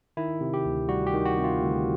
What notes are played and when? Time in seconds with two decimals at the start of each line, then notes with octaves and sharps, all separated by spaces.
0.17 D#3 E4
0.41 C3
0.54 G4
0.66 D2
0.89 G3 F#4
1.07 G4
1.14 D#3
1.25 F#4
1.38 C3
1.44 F4
1.61 D2